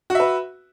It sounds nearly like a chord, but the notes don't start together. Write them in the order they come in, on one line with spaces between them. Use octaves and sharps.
F#4 E5 B4